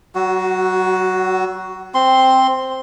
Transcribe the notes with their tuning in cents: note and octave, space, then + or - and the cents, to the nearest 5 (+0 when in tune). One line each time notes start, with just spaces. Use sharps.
F#3 +35 F#4 +0
C4 +0 C6 +0